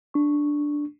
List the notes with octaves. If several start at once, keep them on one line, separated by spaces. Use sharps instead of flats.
D4 C#6